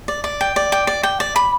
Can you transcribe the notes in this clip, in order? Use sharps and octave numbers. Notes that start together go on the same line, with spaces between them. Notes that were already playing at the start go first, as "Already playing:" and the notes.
D5
D5
G5
D5
G5
D5
G5
D5
B5